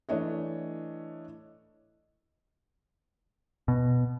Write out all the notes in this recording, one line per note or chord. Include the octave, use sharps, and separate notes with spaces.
E3 A3 D4 C#5 D#5
B2